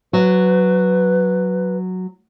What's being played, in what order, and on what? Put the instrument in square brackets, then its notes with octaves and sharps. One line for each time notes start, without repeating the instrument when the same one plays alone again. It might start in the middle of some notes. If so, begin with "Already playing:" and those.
[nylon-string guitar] F#3 [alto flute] B4